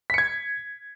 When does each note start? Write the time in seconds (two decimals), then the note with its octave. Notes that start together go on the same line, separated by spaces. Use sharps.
0.10 B6
0.14 C#7
0.18 G#6